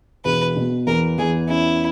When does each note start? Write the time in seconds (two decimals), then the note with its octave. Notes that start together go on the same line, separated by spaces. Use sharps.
0.25 E1 B4
0.57 B2
0.87 E2 A#4
1.18 E2 G#4
1.49 C#4 E4